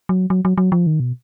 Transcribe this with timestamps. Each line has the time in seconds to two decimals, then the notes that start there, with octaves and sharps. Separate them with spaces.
0.09 F#3
0.30 F#3
0.45 F#3
0.58 F#3
0.72 F3
0.87 D#3
1.00 B2